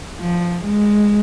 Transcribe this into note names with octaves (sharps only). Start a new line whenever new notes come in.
F3
G#3